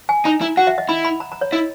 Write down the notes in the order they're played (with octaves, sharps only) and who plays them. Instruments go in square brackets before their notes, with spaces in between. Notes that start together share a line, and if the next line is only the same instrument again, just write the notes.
[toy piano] G#5
[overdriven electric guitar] D#4 [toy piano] A#5
[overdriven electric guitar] E4 [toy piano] A#5
[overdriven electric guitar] F#4 [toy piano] F#5
[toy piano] E5
D#5
[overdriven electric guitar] E4 [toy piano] B5
[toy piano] B5
A#5
A#5
C#5
[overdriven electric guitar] E4 [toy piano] D#5